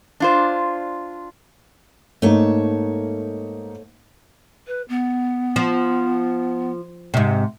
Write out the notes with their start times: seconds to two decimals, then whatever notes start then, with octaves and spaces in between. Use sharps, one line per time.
0.20 D4 F4 C5
2.22 G#2 A3 A#3 D#4 C#5 A5
4.66 B4
4.88 B3
5.56 F3
7.14 G#2 C3